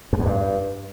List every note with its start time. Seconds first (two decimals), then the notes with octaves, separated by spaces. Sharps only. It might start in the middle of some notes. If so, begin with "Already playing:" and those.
0.13 F2
0.19 E2
0.26 G2